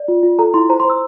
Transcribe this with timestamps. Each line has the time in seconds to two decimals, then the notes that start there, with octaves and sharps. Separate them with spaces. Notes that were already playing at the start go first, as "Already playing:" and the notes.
Already playing: D5
0.08 F4
0.23 F4
0.39 A4 A#5
0.54 E4 C6
0.69 C5 A#5
0.80 C6
0.85 C5
0.90 E6